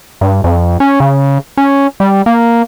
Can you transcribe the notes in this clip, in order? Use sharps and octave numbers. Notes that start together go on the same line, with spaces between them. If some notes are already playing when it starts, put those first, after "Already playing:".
G2
F2
C#4
C#3
C#4
G3
A#3